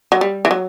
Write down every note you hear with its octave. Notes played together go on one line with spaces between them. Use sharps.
F#3
G3
E3
F#3